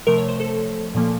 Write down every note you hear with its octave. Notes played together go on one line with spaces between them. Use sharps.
C3 F3 A3 A#4
C#5
C5
A4
A#2 F3 A#3